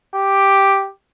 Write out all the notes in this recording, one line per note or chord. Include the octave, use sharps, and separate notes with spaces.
G4